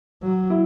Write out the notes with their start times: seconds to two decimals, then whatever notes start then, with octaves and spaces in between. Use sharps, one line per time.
0.23 F#3
0.50 E4